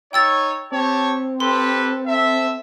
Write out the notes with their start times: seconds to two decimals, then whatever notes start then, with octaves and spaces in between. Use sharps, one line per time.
0.13 D#4 C#5 G5 E6 A6
0.72 C4 G4 C#5 A5
1.40 G4 A4 B4 C6
2.06 A4 E5